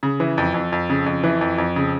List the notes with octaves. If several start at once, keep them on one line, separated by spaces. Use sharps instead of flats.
C#3
E3
F2
F2
F2
C#3
F2
E3
F2
F2
C#3